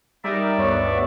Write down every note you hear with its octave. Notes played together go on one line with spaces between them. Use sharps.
G3 D#4 A#4 D5 E5
D2 G2 B3 C#5